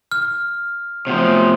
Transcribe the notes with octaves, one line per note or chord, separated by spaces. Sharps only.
F6
C3 F3 F#3 A3 B3 C5